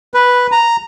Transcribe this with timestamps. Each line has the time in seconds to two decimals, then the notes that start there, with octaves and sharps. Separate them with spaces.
0.14 B4
0.52 A#5